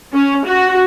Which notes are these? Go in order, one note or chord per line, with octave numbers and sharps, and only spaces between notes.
C#4
F#4